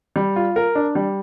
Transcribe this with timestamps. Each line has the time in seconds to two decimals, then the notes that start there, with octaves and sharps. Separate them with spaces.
0.16 G3
0.36 F4
0.56 A#4
0.75 D4
0.95 G3